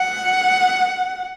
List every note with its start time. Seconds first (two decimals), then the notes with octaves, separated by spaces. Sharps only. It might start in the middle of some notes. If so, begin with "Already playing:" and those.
Already playing: F#5